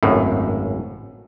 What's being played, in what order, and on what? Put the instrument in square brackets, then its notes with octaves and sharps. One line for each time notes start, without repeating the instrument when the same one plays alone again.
[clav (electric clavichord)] G#1 C#2 F#2 A2